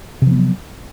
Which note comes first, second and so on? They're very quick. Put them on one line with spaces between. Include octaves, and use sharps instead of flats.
C3 F3 B3 F#3